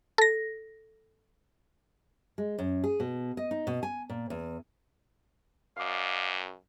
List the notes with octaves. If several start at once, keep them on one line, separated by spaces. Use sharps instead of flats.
A4 A#6
G#3
F#2
G#4
B2
D#5
D#4
B2
G#5
A#2
E2
F#2 D5 D#5 F5